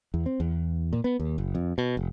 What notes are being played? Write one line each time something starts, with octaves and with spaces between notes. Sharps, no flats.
E2
C4
E2
A#2
B3
D#2
F#1
F2
B2
F1